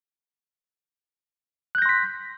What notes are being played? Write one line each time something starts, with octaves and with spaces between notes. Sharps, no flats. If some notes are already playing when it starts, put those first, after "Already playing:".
C6 F#6 G6 A#6 B6